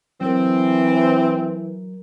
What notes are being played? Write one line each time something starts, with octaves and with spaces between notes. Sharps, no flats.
E3 F#3 C4 A#4